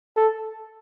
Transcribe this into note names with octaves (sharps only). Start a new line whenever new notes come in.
A4